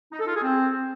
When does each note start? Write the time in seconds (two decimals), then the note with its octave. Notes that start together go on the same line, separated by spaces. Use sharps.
0.12 D#4
0.20 A4
0.27 F4
0.35 G#4
0.43 C4